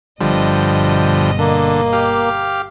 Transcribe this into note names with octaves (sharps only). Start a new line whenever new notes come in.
G1 B2 D3 F3 G3 D#5
D3 A#3
G4 F5